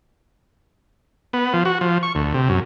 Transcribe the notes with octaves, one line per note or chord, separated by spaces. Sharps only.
B3
F3
F#4
F3
C#6
D2
C3
F#2